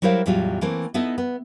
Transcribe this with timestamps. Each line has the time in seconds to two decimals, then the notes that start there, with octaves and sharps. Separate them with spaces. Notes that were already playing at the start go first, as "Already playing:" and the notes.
0.02 F#3 G3 E4 A#4 C5 F5
0.26 E2 A2 F#3 G3 F4
0.61 E3 A3 A#3 C4
0.94 B3 D#4 E4 A4 D#5
1.18 B3